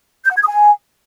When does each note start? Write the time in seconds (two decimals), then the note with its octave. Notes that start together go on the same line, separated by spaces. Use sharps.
0.25 G6
0.30 F#5
0.36 G#6
0.41 D#6
0.47 G#5